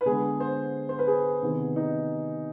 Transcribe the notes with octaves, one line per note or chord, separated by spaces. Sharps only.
B4
D3 G#3 B3 G#4
C5
C5
B4
G#4
C3 D#3 B3
D#4